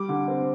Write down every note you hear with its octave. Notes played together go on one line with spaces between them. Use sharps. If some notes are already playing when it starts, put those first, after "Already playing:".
Already playing: G3 D6
D3
C4